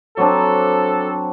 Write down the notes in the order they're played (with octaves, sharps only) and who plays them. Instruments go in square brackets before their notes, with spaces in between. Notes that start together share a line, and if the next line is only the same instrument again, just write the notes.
[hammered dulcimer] F#3 C4 D4 [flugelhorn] A4